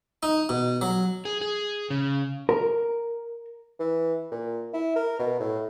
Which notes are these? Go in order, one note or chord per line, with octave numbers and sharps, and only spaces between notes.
D#4
B2
F#3
G#4
G#4
C#3
A#4
E3
A#2
E4
A#4
B2
A2